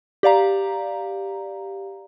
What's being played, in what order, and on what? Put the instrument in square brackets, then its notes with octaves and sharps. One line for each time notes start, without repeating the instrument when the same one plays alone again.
[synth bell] G4 D5 F5 A#5